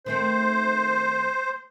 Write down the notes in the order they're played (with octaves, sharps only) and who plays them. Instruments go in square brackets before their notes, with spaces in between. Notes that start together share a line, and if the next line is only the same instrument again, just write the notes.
[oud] D#3 A3 C4 [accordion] C5